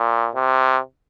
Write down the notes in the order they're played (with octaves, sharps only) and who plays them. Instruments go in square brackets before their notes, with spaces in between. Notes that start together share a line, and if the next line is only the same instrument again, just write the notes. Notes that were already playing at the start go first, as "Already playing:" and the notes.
Already playing: [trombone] A#2
C3